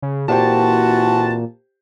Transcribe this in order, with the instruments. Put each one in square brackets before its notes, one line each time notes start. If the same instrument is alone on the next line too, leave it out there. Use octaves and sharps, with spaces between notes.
[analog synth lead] C#3
[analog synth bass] A#2 [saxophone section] E3 C4 F#4 [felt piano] G4 C5 G5 [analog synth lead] A5